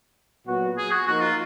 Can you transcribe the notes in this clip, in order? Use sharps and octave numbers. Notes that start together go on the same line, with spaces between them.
A#2 F#3 B3 F#4
G#4
F#4
F3 A#3 D#4 F#4 A#4
F4